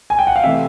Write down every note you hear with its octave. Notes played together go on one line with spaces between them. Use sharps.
G#5
G5
F#5
F5
C3 E3 A3 E5